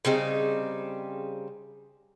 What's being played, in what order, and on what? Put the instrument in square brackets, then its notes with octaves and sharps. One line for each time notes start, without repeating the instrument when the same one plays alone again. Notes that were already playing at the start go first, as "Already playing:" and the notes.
[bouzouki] C#3 G3 C4 D#4